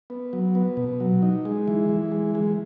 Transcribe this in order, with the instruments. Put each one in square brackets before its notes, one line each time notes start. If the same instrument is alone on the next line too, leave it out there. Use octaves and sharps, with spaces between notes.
[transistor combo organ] B3
F#3
B3
B2
F#3
D#4
G#3
E3
E3
G#3
G#3